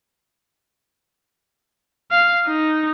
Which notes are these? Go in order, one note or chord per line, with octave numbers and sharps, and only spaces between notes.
F5
D#4